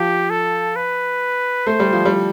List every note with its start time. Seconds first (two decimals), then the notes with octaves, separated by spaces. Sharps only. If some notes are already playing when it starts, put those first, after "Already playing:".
Already playing: F3 G4
0.30 A4
0.76 B4
1.67 A3 C5
1.80 G3
1.93 F3
2.05 G3